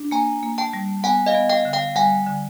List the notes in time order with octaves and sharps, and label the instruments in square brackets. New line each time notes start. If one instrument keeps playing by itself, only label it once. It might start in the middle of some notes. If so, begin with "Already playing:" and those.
Already playing: [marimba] D4
[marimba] A#3 [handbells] G#5 A#5
[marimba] A#3
[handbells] G5 A5
[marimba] G3
[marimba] B3 [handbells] F#5 G#5
[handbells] D#5 F5
[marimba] B3
[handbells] F5 G5
[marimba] D3
[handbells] F5 G5
[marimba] G3 [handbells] F#5 G#5
[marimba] D3